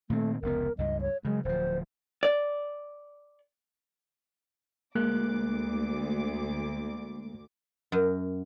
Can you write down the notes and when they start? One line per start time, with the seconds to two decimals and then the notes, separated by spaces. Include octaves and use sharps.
0.10 A#2 D#3 A3 C4
0.42 F1 C#2 B3 A#4
0.78 C#2 G2 D#5
1.01 C#5
1.25 C#3 F#3 G#3
1.45 D1 F3 C5
2.23 D5
4.95 D2 G#3 A#3 D6 F#6
7.92 F#2